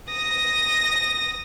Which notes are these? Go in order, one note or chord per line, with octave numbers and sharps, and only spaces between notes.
D#6 A#6